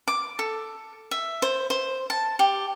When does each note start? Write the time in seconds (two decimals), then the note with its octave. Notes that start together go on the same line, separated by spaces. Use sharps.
0.08 D6
0.39 A4
1.11 E5
1.42 C5
1.70 C5
2.10 A5
2.39 G4